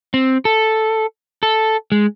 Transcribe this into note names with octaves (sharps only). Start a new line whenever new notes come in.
C4
A4
A4
G#3